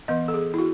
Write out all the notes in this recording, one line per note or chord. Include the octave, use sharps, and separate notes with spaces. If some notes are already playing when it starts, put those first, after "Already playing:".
E3 B3 D#5
A4
G#4
E4
F#4